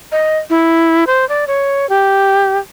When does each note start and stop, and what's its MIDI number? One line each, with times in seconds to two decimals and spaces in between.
0.12 0.38 75
0.50 1.04 64
1.07 1.27 72
1.29 1.45 74
1.47 1.89 73
1.89 2.58 67